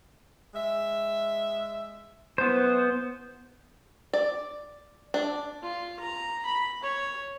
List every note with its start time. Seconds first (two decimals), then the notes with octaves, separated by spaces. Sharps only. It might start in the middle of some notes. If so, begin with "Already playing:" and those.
0.54 G#3 E5
2.38 F#2 B3 C#4 E4 C5
4.13 D5
5.14 D4
5.63 F4
6.00 A#5
6.45 B5
6.83 C#5